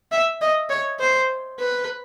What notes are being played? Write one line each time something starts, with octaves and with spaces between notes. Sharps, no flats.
E5
D#5
C#5
C5
B4